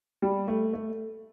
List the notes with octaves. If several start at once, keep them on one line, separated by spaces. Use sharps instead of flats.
G3
A3
A3